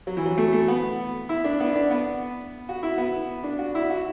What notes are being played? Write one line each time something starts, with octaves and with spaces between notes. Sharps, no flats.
F#3
E3
F#3
A3
A3
B3
E4
D4
B3
D4
B3
F#4
E4
B3
D4
F#4
E4
F#4